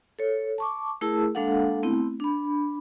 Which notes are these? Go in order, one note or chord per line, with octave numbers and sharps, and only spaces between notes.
A4 C#5
A5 C#6 D6
A3 E4 G#4 A#4 A5 E6
G#3 A#3 D4 A4 F5 F#5
A3 B3 C4 E4
D4 B5